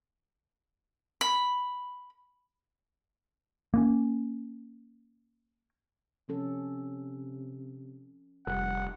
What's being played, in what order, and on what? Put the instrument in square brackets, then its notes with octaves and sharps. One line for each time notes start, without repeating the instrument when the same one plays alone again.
[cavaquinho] B5
[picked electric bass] A#3 B3 C#4
[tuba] C3 [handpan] F3 C#4 A4
[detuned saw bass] F1 [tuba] G3 [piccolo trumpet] F#5